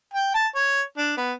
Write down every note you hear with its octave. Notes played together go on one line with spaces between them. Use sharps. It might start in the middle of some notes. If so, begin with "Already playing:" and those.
G5
A5
C#5
D4
B3